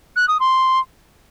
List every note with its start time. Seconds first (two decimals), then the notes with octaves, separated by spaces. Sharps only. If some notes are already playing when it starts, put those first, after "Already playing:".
0.16 F#6
0.28 D#6
0.40 C6